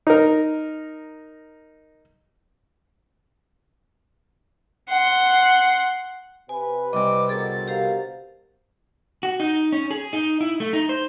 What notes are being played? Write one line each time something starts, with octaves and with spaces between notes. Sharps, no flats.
D#4 A#4
F#5 C6
C3 B4 G#5
C2 C4 D#5 D6
B2 D3 G#4 A#4 A6
G4 C5 F5
F#4
D#4
C#4
G#4
D#4
E4
A3
D#4
C5